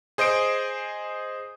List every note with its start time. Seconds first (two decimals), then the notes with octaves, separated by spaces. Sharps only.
0.18 G#4 C5 D#5 D#6 D7